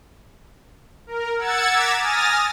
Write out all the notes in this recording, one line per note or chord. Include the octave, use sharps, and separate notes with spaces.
A#4
F#5 E6 G#6 A6 C#7
A#5 D6 E6 G#6 A6 B6
G#5 D#6 F6 A6 A#6